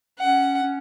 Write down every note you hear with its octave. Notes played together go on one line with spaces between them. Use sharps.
C#4 F#5
C#4